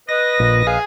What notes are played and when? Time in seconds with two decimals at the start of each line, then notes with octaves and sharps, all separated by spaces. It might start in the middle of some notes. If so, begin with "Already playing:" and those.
0.09 B4 D#5 A#6
0.40 A#1 A#2
0.67 G#4 F5